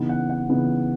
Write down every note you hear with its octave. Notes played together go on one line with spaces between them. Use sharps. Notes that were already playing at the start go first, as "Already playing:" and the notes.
Already playing: C#3 E3 B3 D#4
F#5
F#5
C#3 E3 B3 D#4